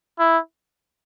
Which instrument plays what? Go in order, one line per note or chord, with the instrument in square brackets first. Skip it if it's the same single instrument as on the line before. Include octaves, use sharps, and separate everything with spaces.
[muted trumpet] E4